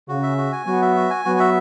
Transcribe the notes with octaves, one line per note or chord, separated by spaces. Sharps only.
C#3 F#4
E5
F#4
G#5
F#3 B3 F#4
E5
F#4
G#5
F#3 B3 F#4
E5